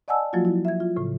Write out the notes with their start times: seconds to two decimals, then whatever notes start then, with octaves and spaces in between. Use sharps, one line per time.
0.08 D5 D#5 F#5 G#5 A5 E6
0.33 F3 F#3 A#3 F4 F#4
0.45 E4
0.65 E5 G#6
0.80 F4
0.96 A2 C#3